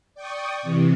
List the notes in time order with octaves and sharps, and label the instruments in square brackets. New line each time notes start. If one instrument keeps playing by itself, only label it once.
[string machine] D5 G5 C#6 D#6
C3 E3